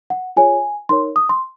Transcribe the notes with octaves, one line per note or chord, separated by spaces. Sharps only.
F#5
F4 G#4 C#5 G#5
D#4 A#4 C#5 C6
D#6
C6